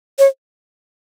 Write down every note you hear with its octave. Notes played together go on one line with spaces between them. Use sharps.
C#5